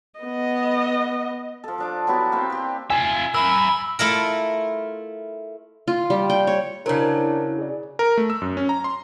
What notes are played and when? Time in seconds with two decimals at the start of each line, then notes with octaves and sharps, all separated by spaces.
0.20 B3 D#5
1.64 F3 A4
1.78 F3 D4 D6
2.07 F#3 B3 E4 G4
2.32 A#3 C4
2.50 G4 C5
2.90 F4 E5 G#5
3.35 A#4 E5 B5 E6
3.99 A3 E4 F4 A#4
5.88 F4
6.10 G3
6.30 G5
6.47 C#5
6.86 C#3 F#3 D4 E4 A#4 C5 A#5
7.59 G#4 D5
7.99 A#4
8.17 A3
8.30 E6
8.42 F#2
8.57 C#4
8.69 A#5
8.84 C6